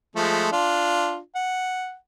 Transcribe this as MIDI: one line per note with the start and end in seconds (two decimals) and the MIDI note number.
0.16 0.49 53
0.16 0.49 56
0.16 0.49 57
0.52 1.18 62
0.52 1.18 65
1.35 1.94 78